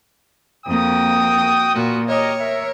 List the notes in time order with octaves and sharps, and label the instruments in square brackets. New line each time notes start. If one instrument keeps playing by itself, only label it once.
[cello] F2 A#3 [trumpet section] F#4 G5 D#6
[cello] A#2 [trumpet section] B3 F4 F#4
[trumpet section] G4 A#4 D#5 [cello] C#5
[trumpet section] A#4 E5